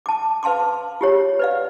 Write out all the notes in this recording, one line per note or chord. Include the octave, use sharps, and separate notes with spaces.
A5 D6
B4 F5 A5 C6 D6
F4 G4 C#5
B4 D5 F5